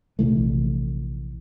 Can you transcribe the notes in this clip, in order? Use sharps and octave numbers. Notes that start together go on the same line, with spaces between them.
A#1 C3 E3 A3